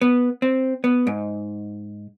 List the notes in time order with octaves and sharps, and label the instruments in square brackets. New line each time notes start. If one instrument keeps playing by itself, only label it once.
[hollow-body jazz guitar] B3
C4
B3
G#2